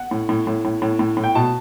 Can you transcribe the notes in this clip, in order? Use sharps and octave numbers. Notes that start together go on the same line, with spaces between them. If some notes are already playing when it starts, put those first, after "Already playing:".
Already playing: F#5
A2
A2
A2
A2
A2
A2
A2
G5
B2 A5